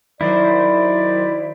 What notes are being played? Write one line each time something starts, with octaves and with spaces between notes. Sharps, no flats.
D#3 F#3 E4 C5 D5